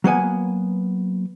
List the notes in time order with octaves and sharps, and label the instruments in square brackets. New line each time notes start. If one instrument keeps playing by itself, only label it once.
[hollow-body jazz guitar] F#3 A#3 B3 G#5